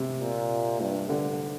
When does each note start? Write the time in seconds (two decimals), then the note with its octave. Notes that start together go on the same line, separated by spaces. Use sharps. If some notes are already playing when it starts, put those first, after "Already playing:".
Already playing: C3
0.21 A#2
0.81 G2
1.09 G2 D3